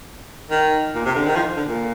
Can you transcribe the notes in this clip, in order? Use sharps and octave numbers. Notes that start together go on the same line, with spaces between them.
D#3
A#2
C3
D3
D#3
F3
D3
A#2